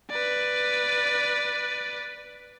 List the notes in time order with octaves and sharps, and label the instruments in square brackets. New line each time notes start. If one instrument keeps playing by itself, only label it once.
[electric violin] B4 D5